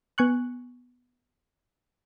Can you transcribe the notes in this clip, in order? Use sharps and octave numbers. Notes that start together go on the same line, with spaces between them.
B3 G#5 C#6 F#6